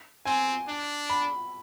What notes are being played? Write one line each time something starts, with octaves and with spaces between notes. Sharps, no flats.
C4 G#5
D4
B5